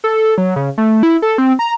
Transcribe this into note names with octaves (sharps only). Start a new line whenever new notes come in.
A4
F#3
C#3
A3
E4
A4
C4
A#5